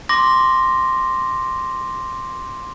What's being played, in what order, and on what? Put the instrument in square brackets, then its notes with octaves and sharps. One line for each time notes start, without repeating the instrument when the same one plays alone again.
[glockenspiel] C6 D6 A#6